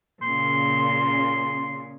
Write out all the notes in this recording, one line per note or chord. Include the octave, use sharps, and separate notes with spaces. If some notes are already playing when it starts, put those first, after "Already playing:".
A#2 C#3 C6